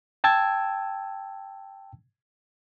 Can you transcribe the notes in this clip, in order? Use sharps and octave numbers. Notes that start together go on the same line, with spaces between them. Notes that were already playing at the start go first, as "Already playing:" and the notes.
G5 A5 E6 G#6